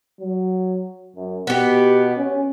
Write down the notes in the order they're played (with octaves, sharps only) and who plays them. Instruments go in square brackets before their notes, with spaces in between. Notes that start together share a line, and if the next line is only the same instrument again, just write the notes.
[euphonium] F#3
F#2
[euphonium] B2 [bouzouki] B3 G4
[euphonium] C#4